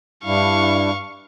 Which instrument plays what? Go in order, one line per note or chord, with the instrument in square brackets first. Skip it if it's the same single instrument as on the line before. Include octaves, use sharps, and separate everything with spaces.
[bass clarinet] G2 [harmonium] G3 D4 E4 [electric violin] F5 C#6